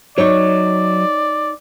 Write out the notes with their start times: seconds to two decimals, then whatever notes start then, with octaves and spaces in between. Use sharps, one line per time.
0.18 F#3 D#4 C#5 D5